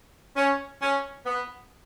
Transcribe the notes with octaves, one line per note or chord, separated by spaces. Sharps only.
C#4
C#4
B3